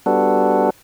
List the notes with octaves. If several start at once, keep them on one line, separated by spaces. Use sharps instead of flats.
G3 B3 D4 F#4 A4